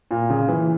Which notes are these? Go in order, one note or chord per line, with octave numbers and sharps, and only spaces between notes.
A#2
C#3
E3